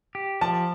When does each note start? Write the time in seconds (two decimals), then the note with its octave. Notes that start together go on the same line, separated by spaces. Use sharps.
0.15 G4
0.41 F3 A5